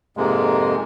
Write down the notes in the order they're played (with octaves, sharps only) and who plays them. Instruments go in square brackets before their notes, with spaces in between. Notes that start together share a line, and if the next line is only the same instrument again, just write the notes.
[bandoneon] F2 G#2 C3 G#3 A#3